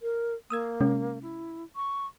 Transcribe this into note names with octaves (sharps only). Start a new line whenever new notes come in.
A#4
A#3 D#6 E6 G#6
C3 G#3 C#4
E4
C#6